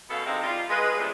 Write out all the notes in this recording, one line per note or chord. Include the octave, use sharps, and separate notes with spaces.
F#2 B2 B3 A4 F5
F2 C3 G#3 C4 D#4 F5
G3 F4
G#3 B4
E2 F3 G3 A3 D4